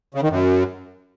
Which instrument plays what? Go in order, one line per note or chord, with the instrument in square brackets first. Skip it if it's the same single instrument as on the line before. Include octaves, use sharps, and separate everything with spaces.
[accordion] C#3
D#3
F#2